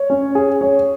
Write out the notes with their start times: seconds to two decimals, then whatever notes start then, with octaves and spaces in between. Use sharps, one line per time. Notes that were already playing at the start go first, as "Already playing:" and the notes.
Already playing: C#5
0.10 C#4
0.35 G#4
0.61 C#5